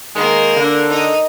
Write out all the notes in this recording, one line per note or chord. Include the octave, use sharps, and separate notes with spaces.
D#3 G#3 A#3 A#4
D3
D#4 D#5